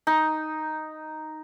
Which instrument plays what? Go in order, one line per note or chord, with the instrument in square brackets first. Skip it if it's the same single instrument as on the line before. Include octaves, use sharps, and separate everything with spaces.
[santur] D#4